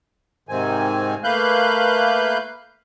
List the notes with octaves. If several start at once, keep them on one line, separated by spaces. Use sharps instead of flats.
G#2 C3 D#3 C4 G#5
A3 A#3 B4 F5 F#6 G6